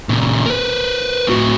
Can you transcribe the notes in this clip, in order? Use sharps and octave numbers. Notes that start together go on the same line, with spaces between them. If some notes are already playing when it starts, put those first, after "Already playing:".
A#2 C#3
A#4 B4
A2 F#4